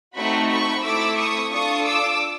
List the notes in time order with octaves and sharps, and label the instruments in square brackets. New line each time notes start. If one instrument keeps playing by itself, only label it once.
[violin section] A3 C4 D#4 F#4 B5 C#6
B5 C#6
A3 C4 E4 D6 E6
C#6 D#6
D4 F4 A4 C#6 D#6
D6 E6